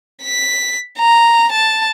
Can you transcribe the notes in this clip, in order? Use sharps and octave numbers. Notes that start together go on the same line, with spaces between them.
B6
A#5
A5